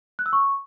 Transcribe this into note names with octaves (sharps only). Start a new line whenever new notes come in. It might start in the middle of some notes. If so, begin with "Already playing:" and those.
F#6
E6
C#6